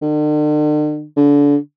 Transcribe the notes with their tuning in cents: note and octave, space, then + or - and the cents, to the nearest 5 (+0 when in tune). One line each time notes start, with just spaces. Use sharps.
D3 +45
D3 -30